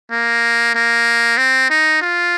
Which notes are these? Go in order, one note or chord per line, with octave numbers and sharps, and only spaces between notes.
A#3
A#3
C4
D#4
F4